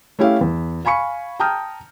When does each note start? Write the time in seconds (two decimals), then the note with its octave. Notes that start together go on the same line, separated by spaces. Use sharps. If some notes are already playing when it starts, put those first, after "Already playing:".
0.19 A3 C#4 E4 G4 F5
0.41 E2
0.85 F5 G#5 B5 C#6 C#7
1.40 G5 A5 A#5 D#6 F6 G6